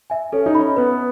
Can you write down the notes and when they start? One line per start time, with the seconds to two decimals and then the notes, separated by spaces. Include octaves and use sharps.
0.10 E5 G#5
0.32 C#4 A4
0.46 D#4
0.55 C#4 E5 B5
0.76 B3 B4